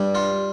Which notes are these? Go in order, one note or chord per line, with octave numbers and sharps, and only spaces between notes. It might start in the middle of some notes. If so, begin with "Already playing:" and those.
Already playing: G2 G3
F4